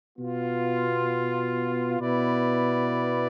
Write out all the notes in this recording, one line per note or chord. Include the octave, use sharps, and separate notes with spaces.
B2 B3 F4
B2 B3 E4 B4 D5